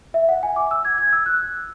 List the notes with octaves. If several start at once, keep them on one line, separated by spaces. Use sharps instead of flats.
E5
F#5
G#5
D6
E6
G#6
G#6
E6
F#6